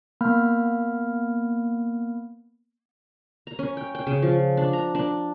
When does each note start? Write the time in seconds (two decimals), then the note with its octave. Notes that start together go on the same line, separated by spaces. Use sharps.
0.21 A#3 B3 B5 F6
3.47 A#5
3.59 C#4
3.77 G5
3.95 G5
4.07 C#3
4.22 F3
4.57 D4
4.73 A#5
4.95 D4